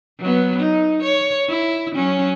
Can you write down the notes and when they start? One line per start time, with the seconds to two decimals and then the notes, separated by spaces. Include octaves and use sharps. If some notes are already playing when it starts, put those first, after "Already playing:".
0.19 F#3 B3
0.59 D#4
1.03 C#5
1.49 E4
1.95 F#3 C#4